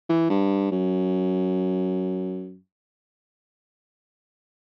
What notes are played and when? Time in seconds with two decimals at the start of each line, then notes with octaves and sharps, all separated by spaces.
0.09 E3
0.30 G2
0.71 F#2